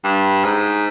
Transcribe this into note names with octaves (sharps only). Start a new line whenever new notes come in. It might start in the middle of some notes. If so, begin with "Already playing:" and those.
G2
G#2